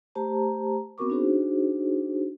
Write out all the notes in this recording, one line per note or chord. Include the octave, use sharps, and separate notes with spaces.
A3 G4 C5 A5 A#5
B3 C4 F#4 A#4 C#6 D6
D4 D#4 F#4 G#4 C5